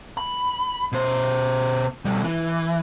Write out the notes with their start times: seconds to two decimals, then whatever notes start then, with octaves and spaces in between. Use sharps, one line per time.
0.17 B5
0.92 B2 C5
2.05 B2 G3
2.24 E3